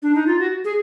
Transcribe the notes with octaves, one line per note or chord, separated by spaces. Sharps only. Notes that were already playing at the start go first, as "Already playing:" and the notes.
D4
D#4
F4
F#4
G#4